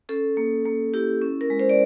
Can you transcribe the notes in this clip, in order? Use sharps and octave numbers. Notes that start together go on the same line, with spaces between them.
C#4 A4
A#3
A#3
E4 G4
C#4
A#4
G#3
C5
D5